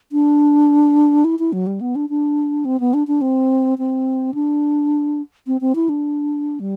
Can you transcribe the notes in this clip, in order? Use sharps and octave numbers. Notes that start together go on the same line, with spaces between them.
D4
E4
E4
F#3
G3
B3
D4
D4
C4
B3
D4
D4
C4
C4
D4
C4
C4
E4
D4
G3